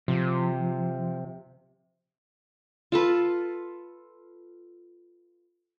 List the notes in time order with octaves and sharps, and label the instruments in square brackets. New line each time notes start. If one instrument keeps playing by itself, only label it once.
[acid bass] C3 [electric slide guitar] F3
[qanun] F4 A4 B4